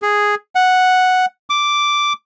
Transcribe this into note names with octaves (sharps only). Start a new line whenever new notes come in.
G#4
F#5
D6